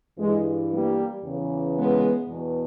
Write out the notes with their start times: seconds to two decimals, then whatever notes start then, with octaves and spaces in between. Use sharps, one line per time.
0.18 G2 E3 G#3
0.71 G3 A#3
1.24 E2 C#3 E3
1.76 G#3 B3
2.29 E2 B2